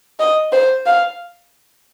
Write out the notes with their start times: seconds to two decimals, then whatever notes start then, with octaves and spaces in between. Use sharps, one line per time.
0.19 D#5
0.52 C5
0.86 F5